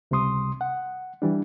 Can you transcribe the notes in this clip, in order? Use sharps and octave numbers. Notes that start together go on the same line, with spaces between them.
C#2 C3 G3 C6 D#6
F#5
E3 G3 D4